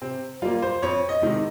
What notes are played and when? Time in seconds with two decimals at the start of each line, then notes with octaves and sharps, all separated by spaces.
0.02 C3 C4
0.42 G3 A#3 F4
0.62 C5
0.82 F2 C#5
1.09 D#5
1.22 C3 D#3 G#3